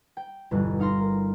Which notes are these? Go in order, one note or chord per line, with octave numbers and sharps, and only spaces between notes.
G5
G1 E2 G2 B2 D#5 F#6
D#4 F5 C6 A#6
A#4